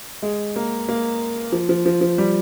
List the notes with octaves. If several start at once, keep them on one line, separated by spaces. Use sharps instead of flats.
G#3
A#3
A#3
F3
F3
F3
F3
G3